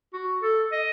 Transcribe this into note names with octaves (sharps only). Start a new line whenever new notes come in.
F#4
A4
D#5